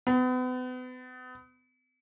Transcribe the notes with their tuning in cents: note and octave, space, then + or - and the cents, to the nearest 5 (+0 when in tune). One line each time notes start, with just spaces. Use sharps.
B3 +40